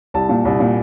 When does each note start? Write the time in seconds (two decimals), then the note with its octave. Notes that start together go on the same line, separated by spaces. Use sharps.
0.14 C2 A5
0.29 A#2
0.45 C2
0.60 A#2